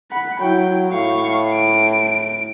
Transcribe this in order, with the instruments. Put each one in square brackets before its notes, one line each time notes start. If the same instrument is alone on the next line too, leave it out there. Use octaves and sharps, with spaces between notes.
[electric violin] F#5 B5
[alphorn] F#3 [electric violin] E4 G5
[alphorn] A2 [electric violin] F5 C#6
[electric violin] D7